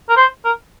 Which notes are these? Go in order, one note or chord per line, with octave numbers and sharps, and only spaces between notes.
A#4
C5
A#4